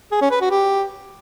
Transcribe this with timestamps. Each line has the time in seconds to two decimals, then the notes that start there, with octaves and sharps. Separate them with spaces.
0.12 G#4
0.21 C#4
0.31 B4
0.41 F#4
0.51 G4